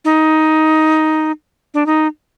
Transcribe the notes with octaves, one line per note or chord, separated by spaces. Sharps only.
D#4
D4
D#4